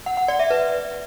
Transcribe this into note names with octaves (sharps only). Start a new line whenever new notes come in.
F#5
F#5
D5
E5
B4